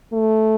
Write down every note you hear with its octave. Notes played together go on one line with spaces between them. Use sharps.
A3